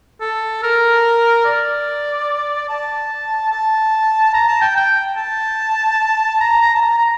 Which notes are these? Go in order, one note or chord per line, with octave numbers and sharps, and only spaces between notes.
A4
A#4
D5
A5
A5
A#5
A5
G5
G5
A5
A#5
A#5
A5
A#5
A#5